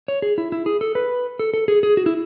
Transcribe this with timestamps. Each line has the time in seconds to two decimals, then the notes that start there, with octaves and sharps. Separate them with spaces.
0.08 C#5
0.22 G#4
0.38 E4
0.52 E4
0.66 G#4
0.81 A4
0.95 B4
1.39 A4
1.54 A4
1.68 G#4
1.83 G#4
1.97 F#4
2.06 E4